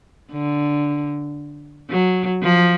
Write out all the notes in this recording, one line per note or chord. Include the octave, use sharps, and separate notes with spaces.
D3
F#3
F3